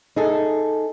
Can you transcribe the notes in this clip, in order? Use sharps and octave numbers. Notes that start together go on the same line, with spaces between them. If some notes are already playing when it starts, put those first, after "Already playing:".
D#4 G#4 A4